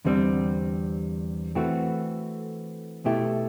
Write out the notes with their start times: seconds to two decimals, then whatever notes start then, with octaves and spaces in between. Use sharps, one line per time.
0.05 E2 D3 G3 C4
1.55 E3 A3 C4 F#4
3.05 B2 A3 E4 G4